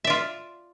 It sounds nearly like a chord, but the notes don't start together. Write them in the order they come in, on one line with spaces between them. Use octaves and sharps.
E5 D5 F4